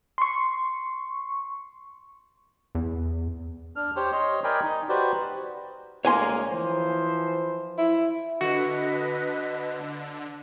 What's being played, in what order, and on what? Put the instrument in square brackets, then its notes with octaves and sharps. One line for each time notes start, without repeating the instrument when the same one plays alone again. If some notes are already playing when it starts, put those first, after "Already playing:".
[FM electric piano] C6 C#6
[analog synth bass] E2
[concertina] D4 F6
G4 C5 C#5
C#5 D#5 C6
A#4 D5 D#5 G5 G#5 B5
D#4
F#4 G4 B4 C5 D5
[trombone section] D2 G#3 A#3 [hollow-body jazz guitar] C#5 G#5 C6
[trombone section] E3 F3 C5
[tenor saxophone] E4
[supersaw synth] D3 [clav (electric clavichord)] F#4 [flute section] B4 D#5